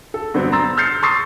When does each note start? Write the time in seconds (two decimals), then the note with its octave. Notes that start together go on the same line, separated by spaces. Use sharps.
0.14 A4
0.34 G2 D3 F#3 B3 C4
0.52 A#5 C6 E6 A6
0.77 E6 F6 G6 A6 C7 C#7
1.03 C6 C#6 D#6 E6 A6 C7